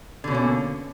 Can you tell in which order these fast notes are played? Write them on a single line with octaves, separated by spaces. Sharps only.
D3 B2 C#4 A#3